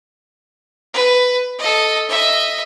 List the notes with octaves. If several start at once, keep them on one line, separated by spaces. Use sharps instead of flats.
B4
A4 D#5
D#5 E5